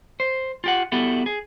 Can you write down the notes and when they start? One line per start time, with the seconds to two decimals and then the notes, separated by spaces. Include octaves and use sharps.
0.20 C5
0.64 F4 G4 F#5
0.92 B3 E4 F#4 G4 A4
1.26 G#4